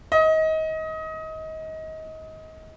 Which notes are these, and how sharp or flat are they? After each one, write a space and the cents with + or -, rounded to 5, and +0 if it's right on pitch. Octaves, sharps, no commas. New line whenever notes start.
D#5 +25